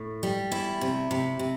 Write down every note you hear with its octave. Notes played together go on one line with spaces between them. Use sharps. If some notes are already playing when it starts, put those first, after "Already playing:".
Already playing: A2
G3
E2 E4
C3
C3
C3